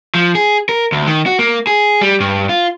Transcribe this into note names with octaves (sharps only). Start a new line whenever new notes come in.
F3
G#4
A#4
D2
D#3
F#4
A#3
G#4
G3
G2
F4